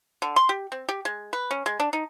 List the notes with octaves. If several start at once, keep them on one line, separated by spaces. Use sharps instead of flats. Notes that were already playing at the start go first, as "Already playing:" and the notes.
D3
C6
G4
C4
G4
G#3
B4
C#4
G#3
D4
D#4